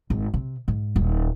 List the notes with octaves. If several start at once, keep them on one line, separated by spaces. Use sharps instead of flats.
G#1
C3
G#2
D#1